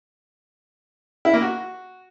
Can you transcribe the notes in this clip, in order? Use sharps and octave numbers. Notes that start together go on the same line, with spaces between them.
E4
A#3
F#4